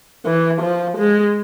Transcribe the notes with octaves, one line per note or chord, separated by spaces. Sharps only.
E3
F3
G#3